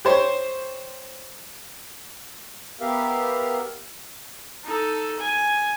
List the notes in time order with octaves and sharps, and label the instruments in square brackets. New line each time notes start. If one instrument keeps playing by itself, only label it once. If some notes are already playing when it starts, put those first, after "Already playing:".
[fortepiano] G4 C5 C#5
[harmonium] B3 G4 A#4 E5 F5
[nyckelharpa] D#4 A4
G#5